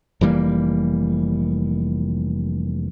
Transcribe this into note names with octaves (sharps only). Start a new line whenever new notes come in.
F1 E3 G3 A#3